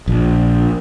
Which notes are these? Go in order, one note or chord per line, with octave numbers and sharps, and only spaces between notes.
A#1